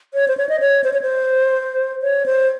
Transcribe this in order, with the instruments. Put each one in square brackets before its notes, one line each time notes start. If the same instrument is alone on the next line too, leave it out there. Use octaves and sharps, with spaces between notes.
[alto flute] C#5
C5
C#5
D#5
C#5
C5
C#5
C5
C#5
C5